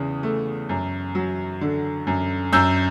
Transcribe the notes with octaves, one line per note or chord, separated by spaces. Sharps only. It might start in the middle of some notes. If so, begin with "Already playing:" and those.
Already playing: E2 C#3
A3
F#2
F#3
D3
F#2
F#2 E6 G6